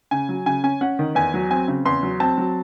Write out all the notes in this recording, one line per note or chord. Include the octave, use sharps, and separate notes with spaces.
C#3 G#5
F#3
C#3 G#5
C#4 G#5
C#4 F#5
D#3
E2 G#5
F#3
C4 G#5
C#3
E2 C6
F#3
C4 A5
F#3